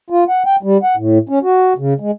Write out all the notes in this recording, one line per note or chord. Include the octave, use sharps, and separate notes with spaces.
F4
F#5
G5
G3
F#5
A2
C#4
F#4
C#3
G#3